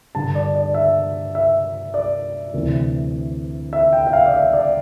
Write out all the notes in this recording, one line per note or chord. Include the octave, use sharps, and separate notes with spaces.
G2 D3 G3 A5
D5
D5
E5
E5
D5
D2 C3 E3
E5
G5
E5
F5
D5
E5
D5